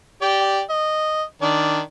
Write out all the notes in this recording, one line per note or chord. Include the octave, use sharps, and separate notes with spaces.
G4 D5 G5
D#5
D#3 D4 D5